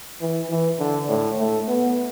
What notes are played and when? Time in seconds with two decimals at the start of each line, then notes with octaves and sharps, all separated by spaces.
0.21 E3
0.50 E3
0.79 D3
1.09 A2
1.38 A3
1.68 B3